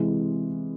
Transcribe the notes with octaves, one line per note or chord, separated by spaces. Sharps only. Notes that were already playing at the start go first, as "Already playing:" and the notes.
Already playing: C3 E3 G#3